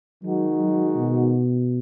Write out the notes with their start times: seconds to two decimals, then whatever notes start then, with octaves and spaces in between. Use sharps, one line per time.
0.23 D#3 F#3 G#3 D#4 F#4
0.59 F#3
0.95 B2